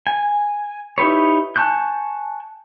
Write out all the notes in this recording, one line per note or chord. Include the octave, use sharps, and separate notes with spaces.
G#5
D#4 E4 G4 B4 C#5
G#5 A5 C#6 F#6 G6